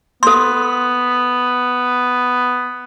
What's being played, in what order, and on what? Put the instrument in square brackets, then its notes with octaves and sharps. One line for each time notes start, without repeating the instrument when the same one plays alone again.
[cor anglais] B3 [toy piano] A4 C6